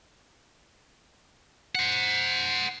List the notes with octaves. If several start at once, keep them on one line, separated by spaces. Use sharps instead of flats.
C5 F#5